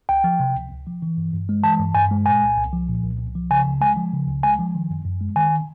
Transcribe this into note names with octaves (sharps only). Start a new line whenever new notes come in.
C#2 G5
F3
C3
C#2
C#2
F3
E3
G2
G2
G#3
E3 A5
G2
G2 G#5
G#3
A#2 G#5
C2
C2
F3
A#2
C2
C2
F3
C#3 G#5
C#2
G#3 G#5
F3
C#3
C#2
G#3 G#5
F3
D#3
F#2
F#2
G#3
D#3 G#5